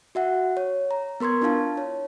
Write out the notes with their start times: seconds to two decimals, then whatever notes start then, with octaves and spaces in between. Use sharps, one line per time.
0.15 F#4 E5 F#5
0.57 C#5
0.91 A#5
1.20 B3 A#4 C6 C#6 G#6
1.42 D4 E4 F4 F5 A5
1.77 C#5